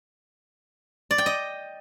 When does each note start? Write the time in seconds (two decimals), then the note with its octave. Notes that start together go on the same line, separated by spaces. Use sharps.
1.11 D5
1.18 G5
1.26 D#5